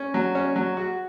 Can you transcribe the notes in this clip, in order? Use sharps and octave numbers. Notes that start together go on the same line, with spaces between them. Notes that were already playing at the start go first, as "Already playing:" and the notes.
Already playing: C#4
F#3
C#4
F#3
F#4